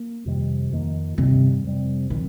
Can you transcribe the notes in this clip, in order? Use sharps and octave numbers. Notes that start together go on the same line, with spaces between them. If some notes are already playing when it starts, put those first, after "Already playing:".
Already playing: A#3
F2 C3 D#3 G3
F2 D#3 A#3
G2 C3 D#3 G3
F2 C3 G3 C4
A#2 D#3 F3 C4